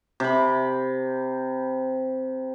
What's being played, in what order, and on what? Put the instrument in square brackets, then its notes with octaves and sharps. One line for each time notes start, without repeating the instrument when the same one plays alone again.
[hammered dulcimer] C3 B5